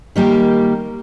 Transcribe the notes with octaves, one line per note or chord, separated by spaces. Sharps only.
D#3 G3 A#3 G4